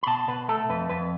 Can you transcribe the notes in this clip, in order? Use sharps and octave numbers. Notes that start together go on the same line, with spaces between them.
B5
B2 A5
B2 B4
A3 A4
F2 B4
F2 B4